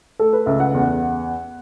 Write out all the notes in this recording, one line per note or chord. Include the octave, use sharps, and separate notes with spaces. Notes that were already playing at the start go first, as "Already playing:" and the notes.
A3 A4
B4
C#2 E5
F#5
E2